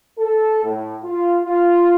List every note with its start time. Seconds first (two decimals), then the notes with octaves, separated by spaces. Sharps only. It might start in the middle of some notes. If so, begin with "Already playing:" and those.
0.18 A4
0.64 A2
1.04 F4
1.44 F4